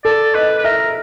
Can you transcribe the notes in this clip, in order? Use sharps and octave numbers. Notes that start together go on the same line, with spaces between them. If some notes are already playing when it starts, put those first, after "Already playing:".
A4 D5
B4 D#5
B4
A#4 E5